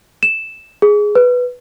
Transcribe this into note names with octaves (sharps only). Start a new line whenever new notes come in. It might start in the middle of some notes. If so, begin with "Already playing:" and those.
E7
G#4
B4